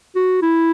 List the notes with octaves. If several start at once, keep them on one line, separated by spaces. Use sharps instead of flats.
F#4
E4